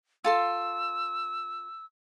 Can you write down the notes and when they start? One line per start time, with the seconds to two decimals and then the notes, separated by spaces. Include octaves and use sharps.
0.24 F4 A4 C6 E6